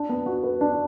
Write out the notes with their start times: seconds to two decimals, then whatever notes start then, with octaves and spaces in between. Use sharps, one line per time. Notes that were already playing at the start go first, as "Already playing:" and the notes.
Already playing: D4
0.09 B3
0.26 F#4
0.43 B4
0.61 D4